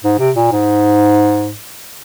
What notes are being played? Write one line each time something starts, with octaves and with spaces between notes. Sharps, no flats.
G#2
C3
A#2
G#2